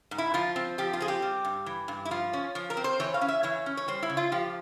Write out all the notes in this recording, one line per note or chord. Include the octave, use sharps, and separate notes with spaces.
G#2
E4
F3 F4
C4
F3 G4
F4
C4 G#4
G4
G3
G2
E3
G2
E4
F3 F4
C#4
F3
A#4
C4
C5
E3 C#5
F5
C#4
E5
E3 C#5
C#4
C#5
G3 C5
E4
C#3
F4
F3 G4